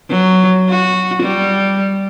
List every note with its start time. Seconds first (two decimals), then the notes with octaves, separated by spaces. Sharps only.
0.10 F#3
0.69 F#4
1.23 G3